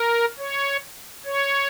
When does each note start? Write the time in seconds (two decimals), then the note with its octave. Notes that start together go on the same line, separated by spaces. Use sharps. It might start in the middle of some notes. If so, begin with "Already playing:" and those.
Already playing: A#4
0.38 C#5
1.25 C#5